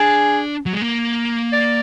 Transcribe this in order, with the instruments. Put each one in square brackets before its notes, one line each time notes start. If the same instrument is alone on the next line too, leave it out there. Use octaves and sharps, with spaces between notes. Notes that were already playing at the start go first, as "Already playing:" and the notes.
Already playing: [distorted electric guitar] D4 [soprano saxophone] G#4
[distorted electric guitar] F#3
G#3
A#3
[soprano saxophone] D5